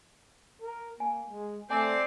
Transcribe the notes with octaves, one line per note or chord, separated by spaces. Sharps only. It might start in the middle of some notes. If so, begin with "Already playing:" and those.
A#4
A#3 G#5
G#3
A3 C4 D5 G#5